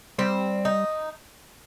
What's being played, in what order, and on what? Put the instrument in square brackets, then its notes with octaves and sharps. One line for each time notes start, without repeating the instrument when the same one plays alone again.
[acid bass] G3 [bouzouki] C4
[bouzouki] D#4